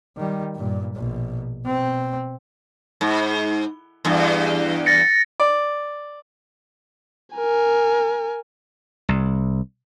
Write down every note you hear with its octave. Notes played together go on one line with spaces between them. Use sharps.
D#3 G3
G2 A#2
A#1 B2
B2 C4
G#2
E2 G2
A6 A#6 C#7
D5
A#4 G#5
C2